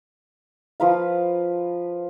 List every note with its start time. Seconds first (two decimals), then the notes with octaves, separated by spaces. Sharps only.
0.80 F3 B4 F5